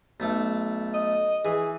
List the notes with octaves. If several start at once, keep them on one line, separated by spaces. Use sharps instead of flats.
B1 A3 A4
D#5
E3 G#4